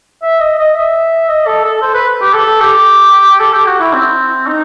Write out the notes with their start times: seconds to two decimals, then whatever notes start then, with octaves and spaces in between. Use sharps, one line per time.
0.23 E5
0.40 D#5
0.58 D#5
0.75 E5
1.29 D#5
1.46 A4
1.64 A4
1.82 C5
1.94 B4
2.21 G4
2.34 A4
2.61 G4
3.40 A4
3.53 G4
3.66 F#4
3.80 E4
3.94 C4
4.47 D#4